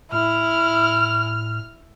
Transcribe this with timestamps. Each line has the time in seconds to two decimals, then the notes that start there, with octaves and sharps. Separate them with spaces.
0.12 A2 E4 F6